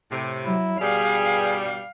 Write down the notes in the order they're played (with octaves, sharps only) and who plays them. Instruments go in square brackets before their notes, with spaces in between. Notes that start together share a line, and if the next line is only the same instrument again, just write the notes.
[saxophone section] A2 C3
[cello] F#3 [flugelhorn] E4
[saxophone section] G2 B2 G3 [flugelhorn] G#4 [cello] F5